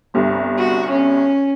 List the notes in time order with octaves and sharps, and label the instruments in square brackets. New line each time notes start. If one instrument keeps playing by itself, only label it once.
[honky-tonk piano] G1 C2 G2
[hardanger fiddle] F#4
C#4